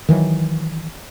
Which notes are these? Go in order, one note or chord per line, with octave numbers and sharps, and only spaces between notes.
D#3 E3 F#3